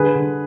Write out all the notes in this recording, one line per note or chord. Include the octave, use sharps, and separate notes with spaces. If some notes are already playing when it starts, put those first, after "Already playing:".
Already playing: D3 G#4 B4
D3